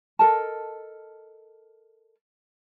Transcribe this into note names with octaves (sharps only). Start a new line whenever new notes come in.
A4 A#4 D#5 A5